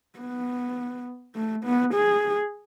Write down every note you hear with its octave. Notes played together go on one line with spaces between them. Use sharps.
B3
A3
B3
G#4